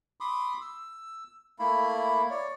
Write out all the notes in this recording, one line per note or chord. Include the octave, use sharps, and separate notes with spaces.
B5 C6 D6 D#6
E6
A3 A#3 E4 B5
C#5 D5